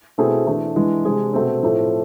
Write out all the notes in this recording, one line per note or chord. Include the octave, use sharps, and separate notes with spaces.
B2 A3 C4 E4 G#4
E3 A3 D4
E3 G#3 D4
C3 G#3 D4 G#4
B2 A3 C4
A2 F3 A3 C4